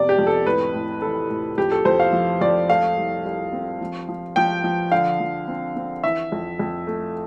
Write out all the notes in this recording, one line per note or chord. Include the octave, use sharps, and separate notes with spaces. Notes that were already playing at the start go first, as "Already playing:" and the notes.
Already playing: F2 C3 B3 D5
G4
F2
A4
A2 B4
A2
E3 A4
A2
F2 G4
A4
F2 C5
F5
F3
F2 D5
A3 F5
C2
C2
C4
F3
F3
F3 G5
F3
D3 F5
F3
C4
C4
E3 E5
F2
F2
A3